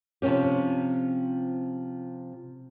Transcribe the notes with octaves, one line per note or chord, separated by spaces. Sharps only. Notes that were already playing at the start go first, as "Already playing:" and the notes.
C3 F3 C4 C#4 G4